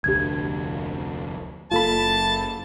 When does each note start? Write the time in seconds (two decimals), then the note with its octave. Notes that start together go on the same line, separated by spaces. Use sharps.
0.04 F1 D2 D4 G4 G#6
1.71 F#1 A#3 F4 A4 A5 B5